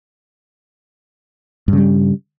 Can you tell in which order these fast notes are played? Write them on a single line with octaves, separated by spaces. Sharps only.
G2 C#3 G3